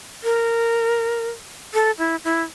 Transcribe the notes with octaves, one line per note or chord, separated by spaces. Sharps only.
A#4
A4
E4
E4